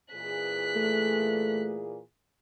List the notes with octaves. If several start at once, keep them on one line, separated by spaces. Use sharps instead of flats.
A#2 E3 G#4 F#6 B6
A3